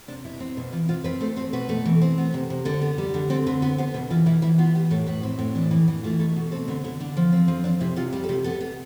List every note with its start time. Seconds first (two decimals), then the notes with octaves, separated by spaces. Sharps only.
0.08 C3 D4
0.24 B2 E4
0.40 C4
0.57 B2
0.72 E3 F4
0.89 C4 F4
1.04 C4 B4
1.21 A3 C5
1.36 C4 C5
1.53 B2 B4
1.69 A3
1.85 E3
2.02 C4
2.18 B3
2.34 C3
2.50 C3
2.65 D3 A4
2.81 B3
2.98 G3
3.14 D3 G4
3.30 C4 A4
3.46 D3 B4
3.62 B3 B4
3.78 B3 C5
3.94 B2 B4
4.10 E3 F4
4.26 E3 E4
4.42 E3 E4
4.58 B3 F4
4.75 B3 G4
4.91 A2 A4
5.06 A2 B4
5.23 C4
5.39 A2
5.55 E3 D4
5.71 E3
5.88 E3
6.03 A3 F4
6.19 B2 A4
6.36 B2
6.51 C4 A4
6.68 D3 B4
6.84 D3 E4
7.00 D3 D4
7.17 F3
7.33 C4
7.48 F3
7.64 C4 D4
7.80 C3 E4
7.96 C3 F4
8.12 G3 G4
8.24 A4
8.29 C3 G4
8.44 B3 A4
8.61 B3